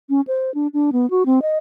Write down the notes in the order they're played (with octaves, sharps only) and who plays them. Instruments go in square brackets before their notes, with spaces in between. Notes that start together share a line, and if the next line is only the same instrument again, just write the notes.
[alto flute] C#4
C5
D4
D4
B3
F#4
C4
D#5